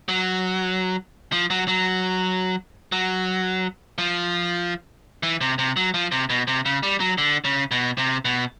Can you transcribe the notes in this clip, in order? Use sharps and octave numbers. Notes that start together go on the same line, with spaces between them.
F#3
F3
F#3
F#3
F#3
F3
E3
C3
C3
F#3
F3
C3
B2
C3
C#3
G3
F#3
D3
C#3
B2
C3
B2